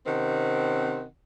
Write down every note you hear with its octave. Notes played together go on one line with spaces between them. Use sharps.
C3 D#3 C4 C#4 F#5